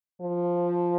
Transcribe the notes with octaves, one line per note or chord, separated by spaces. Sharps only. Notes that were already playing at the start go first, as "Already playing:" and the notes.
F3